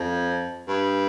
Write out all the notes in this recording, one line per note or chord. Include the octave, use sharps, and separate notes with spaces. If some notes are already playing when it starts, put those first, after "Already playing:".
Already playing: F2
G2